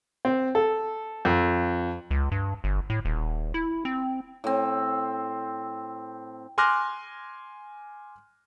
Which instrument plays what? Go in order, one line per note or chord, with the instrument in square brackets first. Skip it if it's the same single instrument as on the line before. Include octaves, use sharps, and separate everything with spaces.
[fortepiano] C4
A4
F2
[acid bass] C#2
G2
G1
A2
D#1
E4
C4
[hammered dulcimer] A2 C4
[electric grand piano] G#5 C6 D6 F6 F#6 A#6